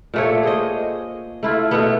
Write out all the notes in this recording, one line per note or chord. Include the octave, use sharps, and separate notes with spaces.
A#2 A3 C#5
G#4 C5 D#5
A3 E4 F4
B2 A3 B3